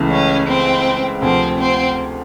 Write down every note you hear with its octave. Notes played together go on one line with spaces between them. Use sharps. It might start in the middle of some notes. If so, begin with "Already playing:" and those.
Already playing: C#2 C#3 E3 A3
C#4
C4
D2 C3 F3 C4
C4